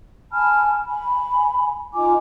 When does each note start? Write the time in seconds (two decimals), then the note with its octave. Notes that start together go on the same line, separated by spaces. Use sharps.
0.32 G#5 A5 B5 F6
0.86 G#5 B5
1.94 D#4 F4 G#5 D6